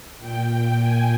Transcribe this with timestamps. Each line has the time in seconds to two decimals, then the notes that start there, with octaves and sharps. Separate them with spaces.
0.19 A#2 G5
0.79 G#5